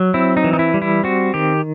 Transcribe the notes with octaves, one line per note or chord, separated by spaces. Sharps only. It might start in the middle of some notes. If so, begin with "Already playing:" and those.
Already playing: F#3
C4 E4
D#4
E3
D#4
E4
G3
E4
C4 F#4
D#3 G4